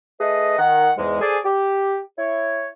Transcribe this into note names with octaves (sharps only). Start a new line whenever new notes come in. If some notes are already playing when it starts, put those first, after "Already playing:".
A3 G#4 B4 D#5
D#3 F#5
E2 G#2 G#3
G#4 A4 C5 D5 G#5
G4
E4 C#5